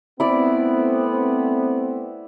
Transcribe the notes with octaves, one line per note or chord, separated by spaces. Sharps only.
A3 B3 C4 E4 D5